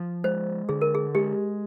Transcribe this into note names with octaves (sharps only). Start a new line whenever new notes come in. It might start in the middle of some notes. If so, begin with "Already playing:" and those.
Already playing: F3
G#3 C5
D3 G#4
A#4
G#4
G#3 G4